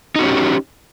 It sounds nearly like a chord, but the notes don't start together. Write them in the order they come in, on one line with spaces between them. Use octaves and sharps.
D#4 F#4 C#4 G4